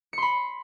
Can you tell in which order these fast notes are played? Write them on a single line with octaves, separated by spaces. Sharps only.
C#7 C6 B5